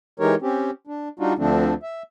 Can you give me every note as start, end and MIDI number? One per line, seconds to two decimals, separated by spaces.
0.20 0.35 52
0.20 0.35 56
0.20 0.35 63
0.20 0.35 67
0.20 0.35 70
0.20 0.35 73
0.42 0.70 60
0.42 0.70 61
0.42 0.70 67
0.87 1.08 62
1.19 1.33 55
1.19 1.33 62
1.19 1.33 63
1.19 1.33 65
1.19 1.33 66
1.38 1.74 38
1.38 1.74 50
1.38 1.74 53
1.38 1.74 57
1.38 1.74 60
1.38 1.74 62
1.83 2.03 76